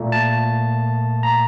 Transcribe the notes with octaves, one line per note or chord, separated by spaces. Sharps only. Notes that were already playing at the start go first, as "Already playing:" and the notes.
Already playing: A#2 A3
A5
A#5